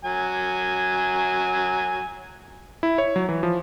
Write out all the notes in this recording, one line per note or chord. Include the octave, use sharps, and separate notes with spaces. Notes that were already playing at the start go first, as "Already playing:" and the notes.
F#3 G#5
E4
C#5
F#3
E3
F3